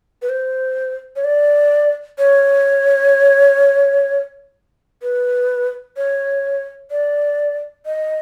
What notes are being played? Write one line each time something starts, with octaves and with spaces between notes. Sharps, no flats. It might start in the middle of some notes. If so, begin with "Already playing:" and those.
B4
C5
C#5
D5
C#5
B4
C#5
D5
D#5